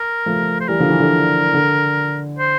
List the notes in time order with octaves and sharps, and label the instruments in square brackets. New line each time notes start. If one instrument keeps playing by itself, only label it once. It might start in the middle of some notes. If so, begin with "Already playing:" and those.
Already playing: [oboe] A#4
[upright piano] F3 A3
[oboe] C5
[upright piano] E3 G3 [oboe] A#4
[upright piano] D3 F3
E3
D3
D3
[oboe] C5